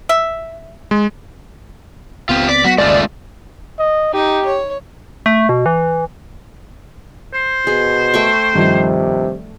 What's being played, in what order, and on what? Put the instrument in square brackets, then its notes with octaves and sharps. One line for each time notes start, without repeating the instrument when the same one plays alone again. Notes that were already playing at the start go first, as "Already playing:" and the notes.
[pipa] E5
[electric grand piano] G#3
[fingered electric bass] C#2 B3 C4 [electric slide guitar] F4 G4
[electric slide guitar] D5 [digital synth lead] B6
[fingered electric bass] F#3 B3 [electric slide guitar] F#4
[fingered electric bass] G1 D#2 C#3 [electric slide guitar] G#3 A3 F4 [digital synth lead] D5
[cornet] D#5
[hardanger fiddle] D#4 [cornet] G4
[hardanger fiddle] C#5
[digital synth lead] A3
B2
E3
[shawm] C5
[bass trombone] B2 [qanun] G#4
[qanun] A3 G5 C#6
[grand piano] G2 D#3 F3 [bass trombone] C3